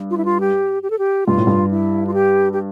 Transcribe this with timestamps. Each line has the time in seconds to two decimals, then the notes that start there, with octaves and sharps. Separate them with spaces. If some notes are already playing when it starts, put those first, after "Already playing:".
Already playing: G2
0.10 F4
0.17 E4
0.25 F4
0.40 G4
0.83 G4
0.90 A4
0.99 G4
1.26 G2 F4
1.37 A2
1.47 G2
1.71 E4
2.07 F4
2.14 G4
2.53 G4